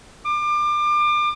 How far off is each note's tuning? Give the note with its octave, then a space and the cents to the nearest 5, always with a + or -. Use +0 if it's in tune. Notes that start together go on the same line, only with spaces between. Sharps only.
D6 +30